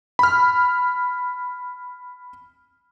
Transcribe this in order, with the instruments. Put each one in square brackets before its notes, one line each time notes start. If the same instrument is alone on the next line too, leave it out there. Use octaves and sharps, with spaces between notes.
[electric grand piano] B5 F6